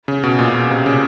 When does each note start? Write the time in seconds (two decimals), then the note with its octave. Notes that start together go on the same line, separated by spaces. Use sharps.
0.08 C#3
0.23 B2
0.39 A#2
0.54 B2
0.71 C3
0.86 C#3